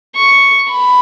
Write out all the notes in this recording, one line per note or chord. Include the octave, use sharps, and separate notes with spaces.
C#6
B5